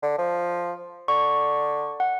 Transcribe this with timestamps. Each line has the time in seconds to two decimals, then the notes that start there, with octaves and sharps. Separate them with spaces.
0.02 D3
0.18 F3
1.08 D3 C#6
2.00 F#5